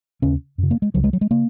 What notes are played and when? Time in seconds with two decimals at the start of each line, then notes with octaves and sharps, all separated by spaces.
0.22 D#2 C#3 C#4
0.58 F#2 C#3
0.71 A#3
0.82 G#3
0.94 C#2 C#3 F#3
1.04 G#3
1.13 F#3
1.21 G#3
1.31 C#3 A#3